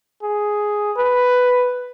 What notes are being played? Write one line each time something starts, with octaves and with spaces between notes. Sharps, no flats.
G#4
B4